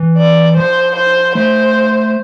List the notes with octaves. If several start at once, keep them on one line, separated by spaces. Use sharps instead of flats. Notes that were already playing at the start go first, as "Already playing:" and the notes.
Already playing: E3
D5
F3 C5
C5
A3 C5